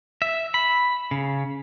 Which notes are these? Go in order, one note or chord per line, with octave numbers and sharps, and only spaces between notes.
E5
B5
C#3